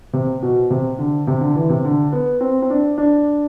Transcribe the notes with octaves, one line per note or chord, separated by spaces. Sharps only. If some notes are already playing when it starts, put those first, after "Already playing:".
C3
B2
C3
D3
C3
D3
E3
C3
D3
B3
C4
C4
D4
D4